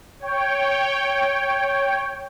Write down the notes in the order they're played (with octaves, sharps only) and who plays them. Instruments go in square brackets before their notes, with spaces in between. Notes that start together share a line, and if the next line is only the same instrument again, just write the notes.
[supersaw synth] C#5 G5